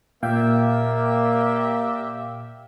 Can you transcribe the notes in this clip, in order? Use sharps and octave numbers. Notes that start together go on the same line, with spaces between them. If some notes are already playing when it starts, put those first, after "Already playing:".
A#2 A#3 G4 D5 E5 F5 G5